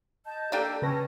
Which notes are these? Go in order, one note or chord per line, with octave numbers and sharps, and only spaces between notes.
D#5 A5 G6
A#3 D4 G4 A4 D5 G5
C#3 C#4 B4 A5 A#6